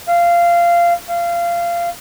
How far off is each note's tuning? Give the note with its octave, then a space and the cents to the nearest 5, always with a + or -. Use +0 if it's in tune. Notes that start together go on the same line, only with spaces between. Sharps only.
F5 -15
F5 -20